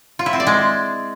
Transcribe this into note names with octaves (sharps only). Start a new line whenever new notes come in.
F4
E4
C4
D5
G#3